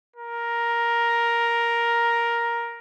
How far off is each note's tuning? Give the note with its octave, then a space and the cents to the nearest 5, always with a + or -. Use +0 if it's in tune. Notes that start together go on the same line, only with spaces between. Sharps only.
A#4 +5